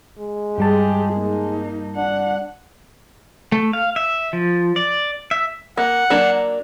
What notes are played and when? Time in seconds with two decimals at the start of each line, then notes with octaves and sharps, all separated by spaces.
0.19 G#3
0.58 G2 G3 G4 G#4 A5
1.14 A#3 D#4
1.96 D4 F#5
3.52 A3
3.73 F5
3.96 E5
4.33 F3
4.76 D5
5.31 E5
5.77 A#3 F#5
6.10 F#3 A#3 D4